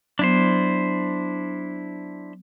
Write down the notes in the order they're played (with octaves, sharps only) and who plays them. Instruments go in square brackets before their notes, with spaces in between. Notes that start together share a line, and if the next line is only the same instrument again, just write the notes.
[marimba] F#3 B3 [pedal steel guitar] D4 E4 C5